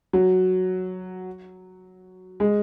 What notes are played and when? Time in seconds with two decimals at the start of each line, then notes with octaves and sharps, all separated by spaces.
0.13 F#3
2.40 G#3